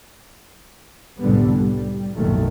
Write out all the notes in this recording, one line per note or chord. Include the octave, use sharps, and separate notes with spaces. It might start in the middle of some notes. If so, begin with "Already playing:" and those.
C2 F2 A2 D3 G3 B3
G3
F#1 B1 A#2 D#3 F#3 A3